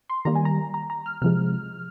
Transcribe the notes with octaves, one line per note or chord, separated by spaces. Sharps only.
C6
D#3 G3 A#3 A#5
G#5
A#5
A#5
A#5
F6
C3 F3 G#3 F6